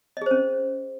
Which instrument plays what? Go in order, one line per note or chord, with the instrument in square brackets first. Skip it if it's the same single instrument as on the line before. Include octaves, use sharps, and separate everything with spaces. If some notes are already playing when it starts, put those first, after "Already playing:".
[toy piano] D#5
G#4
C5
C#4